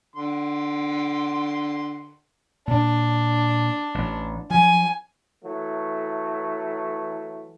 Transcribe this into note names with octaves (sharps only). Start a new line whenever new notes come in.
D3 C6
A#2 D4
A1
F3 F#3 G#5
E3 F#3 A3